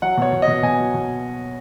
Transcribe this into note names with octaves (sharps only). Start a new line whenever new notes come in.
F#3 F#5
B2 C#5
B2
D#5
B2
B2 G#5
F#3
B2